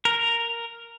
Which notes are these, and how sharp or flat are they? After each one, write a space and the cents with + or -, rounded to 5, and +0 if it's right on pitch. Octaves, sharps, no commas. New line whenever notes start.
A#4 -5